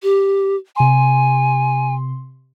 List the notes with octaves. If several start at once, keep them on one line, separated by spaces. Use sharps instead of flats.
G4
C3 G#5 C6